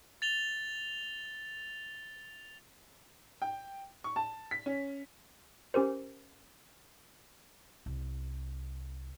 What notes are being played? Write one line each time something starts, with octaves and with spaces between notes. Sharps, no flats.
A6 F7 G7
G5
C#6
A5
B6
C#4
C#4 G4 A#4 C5
C2